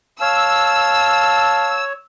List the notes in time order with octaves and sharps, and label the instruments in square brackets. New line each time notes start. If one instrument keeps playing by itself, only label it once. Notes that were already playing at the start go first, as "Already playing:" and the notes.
[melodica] C#5 [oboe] F5 [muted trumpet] A5 [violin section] E6